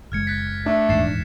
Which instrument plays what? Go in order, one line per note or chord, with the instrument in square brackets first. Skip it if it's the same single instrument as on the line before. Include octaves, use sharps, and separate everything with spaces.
[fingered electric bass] F#1 G#3 [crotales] F6 G#6 C#7
[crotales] F#6 A6 B6
[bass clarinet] A3 [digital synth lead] D4
[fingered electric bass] D#1 E2 G#2 [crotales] A6 C7 E7